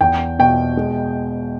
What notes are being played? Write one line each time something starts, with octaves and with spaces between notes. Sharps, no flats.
E2 G5
B2 G5
G#3